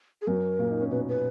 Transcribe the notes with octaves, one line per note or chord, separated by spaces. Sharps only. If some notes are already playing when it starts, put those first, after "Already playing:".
G#4
F#2 F#3 A#4
A#2 A#3
D#4
C#4
B2 B3 B4
B4